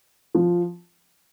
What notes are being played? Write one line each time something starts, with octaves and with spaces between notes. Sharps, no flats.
F3